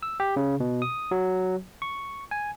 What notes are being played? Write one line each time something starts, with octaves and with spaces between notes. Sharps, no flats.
E6
G4
C#3
B2
D#6
F#3
C#6
G#5